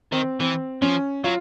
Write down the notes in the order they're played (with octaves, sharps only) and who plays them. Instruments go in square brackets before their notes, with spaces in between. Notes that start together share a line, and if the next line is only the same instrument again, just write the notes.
[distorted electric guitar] D#3 [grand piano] C4
[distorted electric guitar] E3 [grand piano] C4
[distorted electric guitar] F3 [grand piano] C#4
[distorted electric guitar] F#3 [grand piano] F4